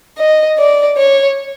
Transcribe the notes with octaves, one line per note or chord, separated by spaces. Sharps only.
D#5
D5
C#5